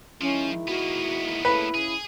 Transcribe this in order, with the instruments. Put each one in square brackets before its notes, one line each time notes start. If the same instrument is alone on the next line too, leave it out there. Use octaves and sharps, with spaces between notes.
[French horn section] D#3 G#3 E4 [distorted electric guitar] F3 [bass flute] C#4
[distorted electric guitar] A#3 B3 [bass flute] F#4
[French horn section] C#3 A3 [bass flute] E4 [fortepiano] B4
[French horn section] C#3 [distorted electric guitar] G#4